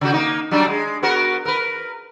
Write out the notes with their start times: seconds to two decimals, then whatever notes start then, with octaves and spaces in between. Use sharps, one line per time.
0.01 C#3 F#4
0.13 A#3 D#4
0.51 F#3 G3 D4
0.67 G#3
1.02 B3 F#4 A#4
1.45 A#4 B4